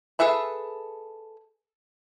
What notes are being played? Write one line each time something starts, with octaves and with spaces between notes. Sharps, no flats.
G#4 A4 B4 E5 B5